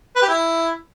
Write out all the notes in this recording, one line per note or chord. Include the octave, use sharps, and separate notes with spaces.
B4
G4
E4